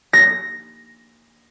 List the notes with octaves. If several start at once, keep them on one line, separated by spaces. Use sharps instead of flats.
A#6